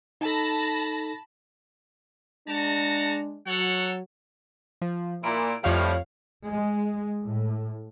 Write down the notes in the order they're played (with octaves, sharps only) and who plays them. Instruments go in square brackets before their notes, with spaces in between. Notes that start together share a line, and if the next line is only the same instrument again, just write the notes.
[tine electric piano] D#4 A4 [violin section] A5 B5 A#6
[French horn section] G#3 D4 [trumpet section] F#4 A5 A#5
[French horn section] F#3 [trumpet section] A4 C#5 F#5
[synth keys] F3
[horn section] A#2 E4 [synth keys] D7
[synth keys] F2 C#5 F5 [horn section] A2 F3 G3
[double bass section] G#3
A2